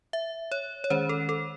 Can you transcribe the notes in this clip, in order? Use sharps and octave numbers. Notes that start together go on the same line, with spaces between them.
E5
C#5
C#5
D#3 G#3 C#4 C5
A4
A4